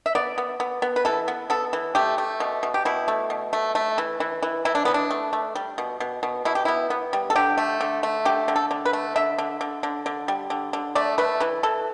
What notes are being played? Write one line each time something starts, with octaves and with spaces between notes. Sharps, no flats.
E5
B3 D5
B3
B3
B3
B4
E3 A4
B3
B3 A4
E3
A3 G4
A3
B2
B2
G4
B2 E4
A3
B2
A3
A3
E3
E3
E3
E3 E4
D4
E3 B3
D4
A3
A3
G3
B2
B2
B2
B2 E4
G4
B3 E4
B3
G3
A4
D3 G4
A3
D3
A3
D3 G4
D3
A4
D3
B4
A3
D3 E5
D3
D3
D3
D3
G3
D3
D3
A3 D5
A3 B4
E3 B4
E3 A4